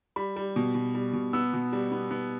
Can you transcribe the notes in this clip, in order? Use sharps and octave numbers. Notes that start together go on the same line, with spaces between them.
G3 B5
G3
B2
B2
G3
B2
B3 E6
B2
G3
B3
B3